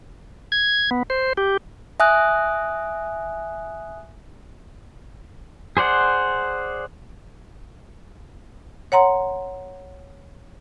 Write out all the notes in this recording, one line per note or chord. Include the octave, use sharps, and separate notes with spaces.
G#6
B3
C5
G4
E5 G#5 D#6 F#6
G#4 C5 D5 F#5
C#5 F#5 A#5 C6